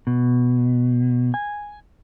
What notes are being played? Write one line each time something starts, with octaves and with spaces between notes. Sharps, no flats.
B2
G#5